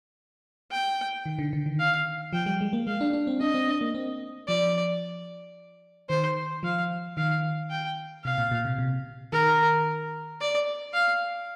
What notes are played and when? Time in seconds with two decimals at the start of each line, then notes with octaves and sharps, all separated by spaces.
0.71 G5
1.26 D#3
1.39 D3
1.53 D3
1.66 D#3
1.80 F5
2.33 F3 G5
2.46 G3
2.61 G#3
2.73 A#3
2.87 G#3 F5
3.01 D4
3.13 D4
3.27 C4
3.40 D4 D#5
3.54 C4
3.68 D4
3.81 A#3
3.95 C4
4.48 F3 D5
6.10 D#3 C5
6.63 F3 F5
7.17 D#3 F5
7.71 G5
8.24 C3 F5
8.38 A#2
8.51 A#2
8.65 C3
8.79 C3
9.33 D#3 A#4
10.40 D5
10.94 F5